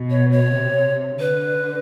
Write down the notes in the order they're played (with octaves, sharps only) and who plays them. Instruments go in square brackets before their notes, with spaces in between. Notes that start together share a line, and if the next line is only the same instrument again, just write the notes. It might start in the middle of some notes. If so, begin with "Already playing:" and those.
Already playing: [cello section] B2
[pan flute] C#5
C#5
[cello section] C3
[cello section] D3 [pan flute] B4